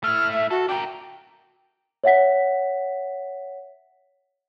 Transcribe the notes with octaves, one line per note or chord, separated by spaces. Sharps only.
A3 E4 F6
E5
F#4 A4
D4 A#4 G5
C#5 E5 F#5 B6